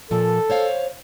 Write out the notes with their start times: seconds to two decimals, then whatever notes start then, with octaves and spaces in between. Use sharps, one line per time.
0.11 A#2 F3 A4
0.50 C5 C#5 F5